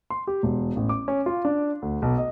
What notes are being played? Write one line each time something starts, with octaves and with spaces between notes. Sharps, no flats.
C6
G4
E1
A1
D6
C#4
F4
D4
D2
B1
D#5